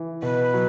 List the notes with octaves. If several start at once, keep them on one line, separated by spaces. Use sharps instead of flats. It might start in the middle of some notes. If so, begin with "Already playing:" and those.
Already playing: E3
B2 B4
F#3